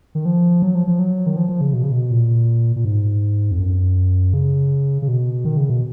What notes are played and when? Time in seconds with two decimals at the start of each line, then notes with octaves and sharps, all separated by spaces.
0.15 D#3
0.25 F3
0.62 F#3
0.75 F3
0.87 F3
0.99 F#3
1.27 D#3
1.37 F3
1.49 F3
1.61 C#3
1.73 B2
1.83 C#3
1.92 B2
2.11 A#2
2.76 A#2
2.85 G#2
3.51 F2
3.59 F#2
4.34 C#3
5.02 C#3
5.08 B2
5.45 D#3
5.57 C#3
5.70 B2